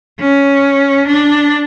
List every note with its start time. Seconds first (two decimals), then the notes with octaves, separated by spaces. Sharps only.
0.20 C#4
1.08 D4